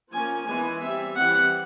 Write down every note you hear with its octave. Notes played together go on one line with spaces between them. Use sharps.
F3 A#3 C#4 G#5
E3 G#3 B3 G#5
G3 C4 E5
E3 G3 C4 F#5